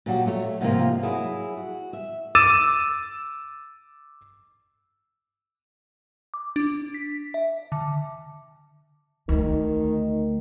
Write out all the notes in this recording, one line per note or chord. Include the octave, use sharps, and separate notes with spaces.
A#2 F#3 F#4 G4
F#3 A3 C#5
G#2 C3 F3 G#3 A#3 F4
F#3 E4 G#4
F#4
E5
D6 E6 A6 D#7 E7
D6
D4
B6
E5
D3
D2 D#3 A3